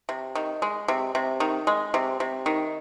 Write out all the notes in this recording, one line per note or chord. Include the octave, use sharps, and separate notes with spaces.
C3
D#3
G#3
C3
C3
D#3
G#3
C3
C3
D#3